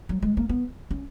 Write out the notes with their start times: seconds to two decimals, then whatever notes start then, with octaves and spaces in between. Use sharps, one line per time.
0.09 F#3
0.22 G#3
0.37 A#3
0.49 B3
0.91 C#4